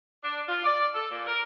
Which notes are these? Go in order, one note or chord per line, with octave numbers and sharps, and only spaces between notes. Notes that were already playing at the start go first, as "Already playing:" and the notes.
D4
F4
D5
A4
A#2
A#4